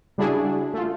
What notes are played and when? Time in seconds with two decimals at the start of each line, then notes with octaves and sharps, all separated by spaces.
0.18 C#3 G3 D4 E4 F#4 G#4
0.74 A3 F4